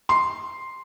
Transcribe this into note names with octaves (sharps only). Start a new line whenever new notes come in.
C6